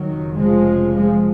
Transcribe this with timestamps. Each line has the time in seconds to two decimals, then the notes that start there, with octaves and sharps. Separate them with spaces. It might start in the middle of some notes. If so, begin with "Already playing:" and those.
Already playing: D#3 F#3
0.08 F1 F2 C#3
0.36 F3 G#3
0.94 F3 G#3